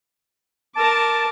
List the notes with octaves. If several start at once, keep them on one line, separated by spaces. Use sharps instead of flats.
A#4 A5 D6